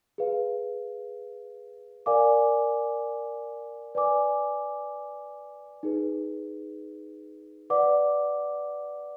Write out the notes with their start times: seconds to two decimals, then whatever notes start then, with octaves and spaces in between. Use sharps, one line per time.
0.18 G#4 B4 F5
2.06 A#4 D5 F5 G#5 D6
3.95 B4 D5 G#5 D6
5.83 D#4 G#4 B4
7.70 B4 D5 F#5 D6